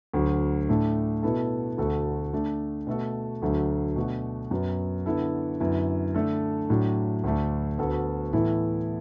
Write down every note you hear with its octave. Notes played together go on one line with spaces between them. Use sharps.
D2 D3 F#3
A2 A3 D4
B2 B3 E4 A4
D2 D3 A3 F#4 A4
D3 A3 D4
B2 A3 F#4 A4
D2 D3 F#3 A3
B2 A3 D4 F#4
F#2 F#3 B3
D3 B3 E4 A4
F#2 D3 B3 E4
D3 A3 D4 A4
A2 F#3 D4
D2 D3 A3 D4
D2 D3 B3 F#4 A4
A2 E3 B3 E4 A4